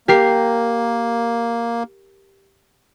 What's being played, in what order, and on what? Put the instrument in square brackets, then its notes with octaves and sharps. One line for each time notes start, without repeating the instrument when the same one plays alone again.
[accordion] A#3 [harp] G4 A#4 C7